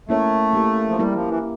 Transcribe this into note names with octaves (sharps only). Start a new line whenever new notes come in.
A3 A#3 C#4 E4 A#4 C#5
A#3 E4 G4 A#4
F3
G3 A#3 E4 G4 A#4
F3
E3